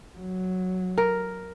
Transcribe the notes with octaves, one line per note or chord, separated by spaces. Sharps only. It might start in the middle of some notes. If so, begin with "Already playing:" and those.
F#3
A#4